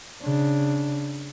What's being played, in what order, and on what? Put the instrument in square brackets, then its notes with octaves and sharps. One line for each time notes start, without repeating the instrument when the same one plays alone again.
[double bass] C#3 D4